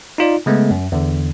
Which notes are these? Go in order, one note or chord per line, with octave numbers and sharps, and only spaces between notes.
D#4 F4 D5
C#3 G#3 A3 B3
F#2
E2 D3